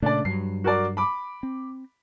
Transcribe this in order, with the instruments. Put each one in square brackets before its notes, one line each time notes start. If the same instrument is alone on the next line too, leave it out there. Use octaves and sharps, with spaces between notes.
[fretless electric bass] A#2 C#3 A3 [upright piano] D4 D5
[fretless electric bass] G2 F#3 [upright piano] C7
[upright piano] F#4 A#4 D5
B5 D6
[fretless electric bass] C4